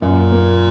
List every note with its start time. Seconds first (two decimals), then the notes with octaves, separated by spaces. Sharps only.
0.02 F#2 A#2
0.32 A#3